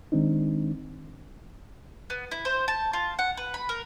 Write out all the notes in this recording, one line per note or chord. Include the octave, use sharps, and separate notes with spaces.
D#3 G#3 C4 D4 D#4
B3
E4
C5
A5
F4
F#5
B4
B5
A#4